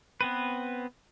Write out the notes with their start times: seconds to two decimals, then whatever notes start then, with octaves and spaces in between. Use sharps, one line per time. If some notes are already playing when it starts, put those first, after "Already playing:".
0.21 B3 C4 B4